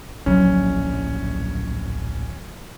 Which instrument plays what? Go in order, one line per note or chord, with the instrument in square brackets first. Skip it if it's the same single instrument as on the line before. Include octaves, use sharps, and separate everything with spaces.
[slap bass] D1 A#1 [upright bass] F#3 [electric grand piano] C#4